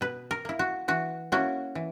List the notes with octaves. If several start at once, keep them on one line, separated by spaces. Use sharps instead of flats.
B2 B4
A#4
A#3 E4
F#4
E3 F#4
A#3 C#4 E4 F#4
E3